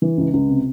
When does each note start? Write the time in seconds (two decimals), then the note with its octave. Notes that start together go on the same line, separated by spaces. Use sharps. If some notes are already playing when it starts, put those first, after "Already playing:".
0.02 E3
0.17 C#2
0.33 C#2
0.49 C3